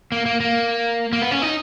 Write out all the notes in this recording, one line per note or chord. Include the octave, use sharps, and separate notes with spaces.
A#3
A#3
A#3
A#3
B3
C#4
D#4